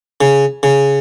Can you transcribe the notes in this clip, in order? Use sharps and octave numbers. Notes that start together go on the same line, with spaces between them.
C#3
C#3